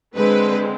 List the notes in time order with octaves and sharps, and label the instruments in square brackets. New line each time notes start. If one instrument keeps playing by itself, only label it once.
[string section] D3 G#3 C4 B4